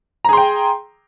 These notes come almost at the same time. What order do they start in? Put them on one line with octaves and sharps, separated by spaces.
A#5 G#4 C6 G5